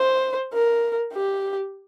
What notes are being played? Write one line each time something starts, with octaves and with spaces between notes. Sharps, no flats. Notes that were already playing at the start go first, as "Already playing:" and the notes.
Already playing: C5
A#4
G4